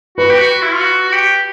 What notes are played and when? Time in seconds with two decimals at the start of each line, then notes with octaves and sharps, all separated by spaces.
0.18 F#4 B4
0.30 G4
0.39 F#4
0.62 E4
0.72 F4
0.81 F#4
1.08 F#4
1.13 G4